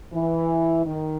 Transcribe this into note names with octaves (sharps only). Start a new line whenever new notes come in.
E3
D#3